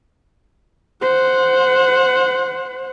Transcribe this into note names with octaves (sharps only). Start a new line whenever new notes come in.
C5 F#5